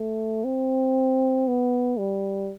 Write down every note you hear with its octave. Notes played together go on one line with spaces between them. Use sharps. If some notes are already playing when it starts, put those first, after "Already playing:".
Already playing: A3
C4
B3
G3